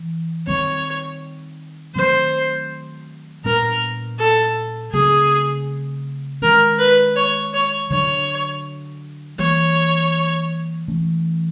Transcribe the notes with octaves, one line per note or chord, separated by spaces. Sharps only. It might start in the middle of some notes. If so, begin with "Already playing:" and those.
Already playing: E3
D#3 G3 C4 C#5
D#3 F#3 A3 C4 C5
A#2 G3 B3 D4 A#4
A4
C#3 F#3 A3 C4 G#4
D#3 G#3 C#4 A#4
B4
C#5
C#5
D3 F#3 A3 D4 C#5
E3 G3 A#3 C#5
E3 A3 C#4